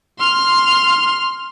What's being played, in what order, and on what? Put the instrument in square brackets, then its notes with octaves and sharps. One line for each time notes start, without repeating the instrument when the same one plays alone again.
[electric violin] C6 F6